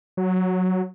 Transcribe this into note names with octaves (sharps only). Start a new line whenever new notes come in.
F#3